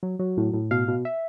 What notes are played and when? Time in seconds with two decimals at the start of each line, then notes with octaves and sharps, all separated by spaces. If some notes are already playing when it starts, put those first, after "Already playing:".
0.03 F#3
0.19 F#3
0.37 A2
0.54 A2
0.71 B2 F5
0.88 B2
1.05 E5